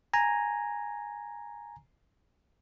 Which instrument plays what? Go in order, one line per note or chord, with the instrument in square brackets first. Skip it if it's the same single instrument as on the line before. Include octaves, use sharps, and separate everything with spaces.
[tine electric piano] G#5 A#5